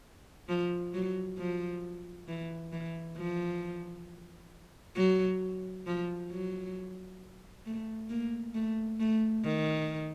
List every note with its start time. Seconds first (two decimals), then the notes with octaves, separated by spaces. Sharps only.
0.48 F3
0.94 F#3
1.38 F3
2.28 E3
2.72 E3
3.17 F3
4.96 F#3
5.86 F3
6.31 F#3
7.66 A3
8.10 A#3
8.54 A3
9.00 A3
9.44 D#3